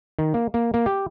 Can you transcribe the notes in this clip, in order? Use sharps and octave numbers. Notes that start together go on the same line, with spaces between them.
D#3
A#3
A#3
A#3
G4